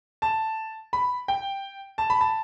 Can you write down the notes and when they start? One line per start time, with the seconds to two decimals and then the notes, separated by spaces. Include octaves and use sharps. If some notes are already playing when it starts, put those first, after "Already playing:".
0.22 A5
0.93 B5
1.28 G5
1.98 A5
2.10 B5
2.21 A5